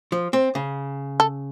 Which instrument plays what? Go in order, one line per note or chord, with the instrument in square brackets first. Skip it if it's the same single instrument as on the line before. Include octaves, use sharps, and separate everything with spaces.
[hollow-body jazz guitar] F3
C4
C#3
[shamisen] A4